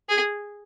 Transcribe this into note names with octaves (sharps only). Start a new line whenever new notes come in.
G#4